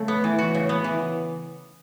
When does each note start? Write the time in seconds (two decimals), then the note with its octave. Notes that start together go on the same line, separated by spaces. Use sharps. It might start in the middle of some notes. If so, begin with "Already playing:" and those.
Already playing: C#3 A3
0.08 B3
0.24 E3
0.38 F#4
0.54 C#3
0.69 B3
0.84 E3